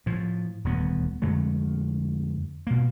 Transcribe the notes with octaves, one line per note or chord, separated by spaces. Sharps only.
A2 F3
D#1 D2 B3
F2 D3 G#3 A3
B2 A#3